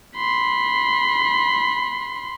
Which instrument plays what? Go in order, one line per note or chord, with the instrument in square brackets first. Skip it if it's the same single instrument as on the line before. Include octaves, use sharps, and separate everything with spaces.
[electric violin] B5 C6